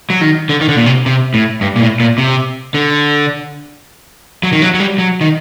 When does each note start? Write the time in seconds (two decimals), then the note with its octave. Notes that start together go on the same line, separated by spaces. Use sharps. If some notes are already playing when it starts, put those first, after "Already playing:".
0.10 F#3
0.21 D#3
0.49 D3
0.61 D#3
0.69 D3
0.77 A#2
0.86 C3
1.06 C3
1.34 A2
1.61 G2
1.76 A#2
1.81 A2
2.00 A#2
2.18 C3
2.74 D3
4.43 F#3
4.52 D#3
4.62 F#3
4.74 F#3
4.80 G3
4.98 F#3
5.21 D#3